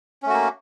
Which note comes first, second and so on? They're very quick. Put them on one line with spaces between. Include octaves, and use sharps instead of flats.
C#4 A3 F#4 A#3